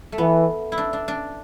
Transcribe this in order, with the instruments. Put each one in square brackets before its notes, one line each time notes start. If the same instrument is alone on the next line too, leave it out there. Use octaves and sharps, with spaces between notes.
[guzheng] A3
[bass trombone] E3 [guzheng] B3
[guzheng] E4
D4
D4
D4